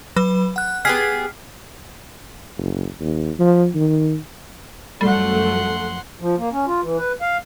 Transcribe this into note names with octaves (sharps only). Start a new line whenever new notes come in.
F#3 B4 B5
F#5 F#6
B3 G4 G#4 F6 B6 C7
F#1
D#2
F3
D#3
F#2 F3 G3 A3 F#5 C6
F3
A#3
C#4
F4
E3
B4
F5